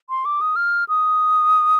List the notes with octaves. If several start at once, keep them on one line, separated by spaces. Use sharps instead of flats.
C6
D6
D#6
F6
D#6